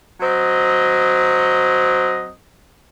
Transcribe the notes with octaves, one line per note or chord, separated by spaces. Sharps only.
F#3 C4 D#5